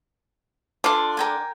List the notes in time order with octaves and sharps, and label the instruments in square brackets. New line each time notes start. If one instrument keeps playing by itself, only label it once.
[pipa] D3 D4 [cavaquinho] F4
[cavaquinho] A#4 G5 G#5